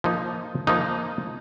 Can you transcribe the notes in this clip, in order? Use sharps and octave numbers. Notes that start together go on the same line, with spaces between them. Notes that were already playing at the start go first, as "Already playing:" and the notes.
F3 A#3 D#4
F3 A#3 D#4